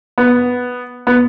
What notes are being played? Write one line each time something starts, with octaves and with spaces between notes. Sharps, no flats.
B3
B3